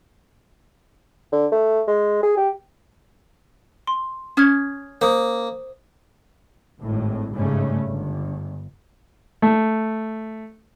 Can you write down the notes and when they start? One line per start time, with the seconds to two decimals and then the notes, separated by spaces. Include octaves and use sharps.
1.32 D3
1.52 A3
1.87 G#3
2.23 G#4
2.37 G4
3.87 C6
4.37 C#4 D#6 F6 G#6
5.01 A#3 C5 D#6
6.77 G#1 A2
7.32 G1 G#2 C#3 G3 A3 C#4
7.88 G1
9.42 A3